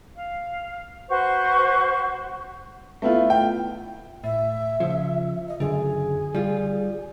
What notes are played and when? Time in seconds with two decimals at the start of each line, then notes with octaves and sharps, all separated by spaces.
0.17 F5
1.09 F#4 B4 C5 C#6
3.02 A3 B3 E4 F4
3.30 G5
4.24 A2 E5
4.80 C#3 F3
5.48 D#5
5.60 C#2 F#2 D3 G#4
6.35 G3 F4